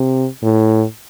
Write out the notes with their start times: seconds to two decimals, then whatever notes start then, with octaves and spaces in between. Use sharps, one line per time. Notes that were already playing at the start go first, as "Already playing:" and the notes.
Already playing: C3
0.43 A2